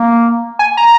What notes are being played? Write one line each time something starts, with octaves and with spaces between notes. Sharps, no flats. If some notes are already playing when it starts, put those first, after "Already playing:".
Already playing: A#3
G#5
A#5